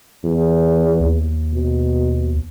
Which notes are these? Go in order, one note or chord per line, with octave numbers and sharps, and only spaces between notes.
E2
D#2
B2